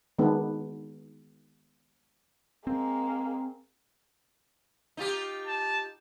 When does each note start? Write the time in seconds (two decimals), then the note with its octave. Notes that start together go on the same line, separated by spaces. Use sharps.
0.19 D#3 G#3 B3 D4
2.67 G#3 A#3 C4
4.97 D#4 F4 G4
5.47 A5